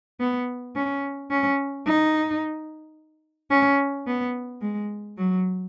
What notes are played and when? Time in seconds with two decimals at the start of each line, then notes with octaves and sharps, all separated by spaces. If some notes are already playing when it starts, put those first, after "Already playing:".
0.20 B3
0.75 C#4
1.31 C#4
1.86 D#4
3.51 C#4
4.07 B3
4.61 G#3
5.17 F#3